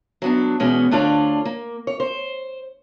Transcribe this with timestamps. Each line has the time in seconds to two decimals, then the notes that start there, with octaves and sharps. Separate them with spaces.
0.22 F#3 B3 D4
0.60 E2 B2 G#3 B3 C#4
0.91 D2 D3 D4 F4 C#5 D5
1.45 A#3
1.87 C#5
2.00 C5